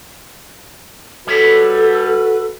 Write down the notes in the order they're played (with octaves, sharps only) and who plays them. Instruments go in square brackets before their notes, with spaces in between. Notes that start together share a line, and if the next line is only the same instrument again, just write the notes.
[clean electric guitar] G3 C#5 E5 [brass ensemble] F#4 B4 [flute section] A4